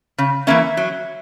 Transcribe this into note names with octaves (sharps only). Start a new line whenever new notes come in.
C#3
E3 A#3 C#4 E5
F#3